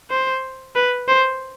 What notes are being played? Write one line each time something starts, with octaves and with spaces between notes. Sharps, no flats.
C5
B4
C5